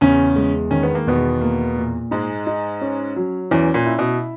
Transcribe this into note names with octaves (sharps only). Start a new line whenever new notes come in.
E2 C#3 C#4
G#3
D#3 C#4
B3
A#3
E2 B2 B3
A#3
A#2
G#2 G#3 D#4
D#4
C#4
F#3
E2 E3 C#4
A#2
E4
B2